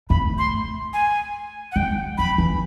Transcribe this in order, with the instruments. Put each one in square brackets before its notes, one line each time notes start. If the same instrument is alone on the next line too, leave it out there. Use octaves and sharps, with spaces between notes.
[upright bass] A3 [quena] B5
[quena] C6
G#5
F#5
[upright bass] G#3 [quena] G5
[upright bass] F#3 [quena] B5
[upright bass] E3